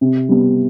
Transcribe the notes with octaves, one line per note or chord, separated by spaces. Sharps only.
C3
G3 B3